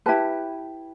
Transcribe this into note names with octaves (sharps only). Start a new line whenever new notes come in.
E4 G4 B4 A5